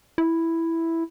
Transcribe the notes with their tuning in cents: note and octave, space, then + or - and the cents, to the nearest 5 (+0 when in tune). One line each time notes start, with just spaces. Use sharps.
E4 +0